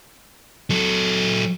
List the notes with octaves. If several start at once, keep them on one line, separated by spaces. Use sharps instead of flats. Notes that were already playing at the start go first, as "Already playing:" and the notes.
F#3 A4